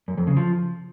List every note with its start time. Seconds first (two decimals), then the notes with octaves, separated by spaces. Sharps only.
0.08 F#2
0.18 F2
0.27 C#3
0.37 F3